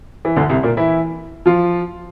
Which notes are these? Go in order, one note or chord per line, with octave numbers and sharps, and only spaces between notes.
E3
D2 D3
C2 C3
A#2 A#3
E3 E4
F3 F4